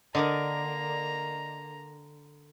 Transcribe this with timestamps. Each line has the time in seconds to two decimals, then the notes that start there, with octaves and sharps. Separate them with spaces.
0.15 D3 A#3 A#4 D5 D#5 A#5